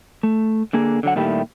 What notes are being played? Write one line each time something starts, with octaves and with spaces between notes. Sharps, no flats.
A3
D3 A#3 G#4
D3 F#3 F#5
A#2 D#3 G3 A3 E4 G4